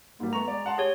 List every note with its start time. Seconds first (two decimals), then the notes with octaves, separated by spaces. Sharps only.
0.20 G#2 G3 A#3
0.33 A3 B3 A#5 C#6 F7
0.48 G#3 D5
0.66 F#5 A5 C6
0.78 G4 G#4 C#5